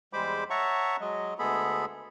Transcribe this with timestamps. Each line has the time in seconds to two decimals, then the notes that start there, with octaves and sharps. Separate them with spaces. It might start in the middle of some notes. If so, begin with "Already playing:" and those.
0.13 E2 G3 G#3 C5 B5 D6
0.50 C#5 E5 F#5 A5 A#5 C#6
1.01 F#3 G#3 D#5
1.39 D2 G#3 B3 G#4 A4 B5